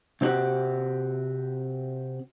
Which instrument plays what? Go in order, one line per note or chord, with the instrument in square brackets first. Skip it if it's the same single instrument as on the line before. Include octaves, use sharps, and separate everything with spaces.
[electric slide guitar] C3 C4 D#4 F#4 G4